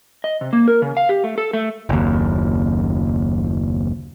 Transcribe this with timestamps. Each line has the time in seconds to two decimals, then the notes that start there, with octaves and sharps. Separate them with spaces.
0.24 D#5
0.41 C3
0.53 A#3
0.68 A#4
0.82 C#3
0.97 F5
1.09 G4
1.24 A3
1.38 A4
1.53 A3
1.89 F#1 D#2